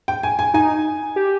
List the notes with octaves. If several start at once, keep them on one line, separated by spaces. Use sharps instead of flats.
G5
G#5
G#5
D#4 G#5
G4